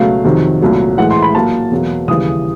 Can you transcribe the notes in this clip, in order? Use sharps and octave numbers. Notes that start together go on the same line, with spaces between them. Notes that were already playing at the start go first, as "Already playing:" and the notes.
Already playing: C#2 B2 F#3 A3 F5
F2 C3 D#3 F#3
C2 A#2 F#3 A3
A2 E3 G#3 F#5
C6
B5
A#2 F#3 A#3 A5
E2 B2 F#3 A#3
D#2 C#3 E3 G3 D#6